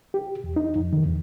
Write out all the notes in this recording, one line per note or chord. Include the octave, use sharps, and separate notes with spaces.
G4
E2
D#4
F2
D#3
E2